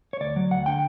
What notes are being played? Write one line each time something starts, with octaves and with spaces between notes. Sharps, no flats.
C#5
D2 D5
F#3
D2 F#5
D3 G5